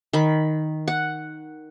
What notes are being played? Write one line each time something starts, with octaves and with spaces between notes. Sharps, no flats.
D#3 B5
F#5